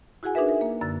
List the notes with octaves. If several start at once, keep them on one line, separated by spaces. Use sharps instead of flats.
E4 F#4 G#4 F#5 G#5
D4 D#4 G#4 A#4 B4 E5
A#4
A#3
F#2 D3 E6 A6